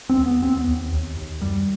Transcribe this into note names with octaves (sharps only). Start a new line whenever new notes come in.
C4
D#2
B3
D#2 C4
B3
D#2
D#2
D#2
F#2 G3